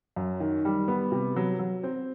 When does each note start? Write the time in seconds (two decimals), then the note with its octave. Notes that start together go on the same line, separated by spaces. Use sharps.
0.16 F#2
0.40 D#3
0.65 G3
0.88 B3
1.12 C3
1.36 F#3
1.59 F#3
1.84 C4